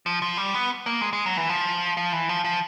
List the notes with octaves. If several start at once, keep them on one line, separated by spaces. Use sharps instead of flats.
F3
F3
G3
B3
A#3
G#3
G#3
F#3
E3
F3
F3
E3
F3
F3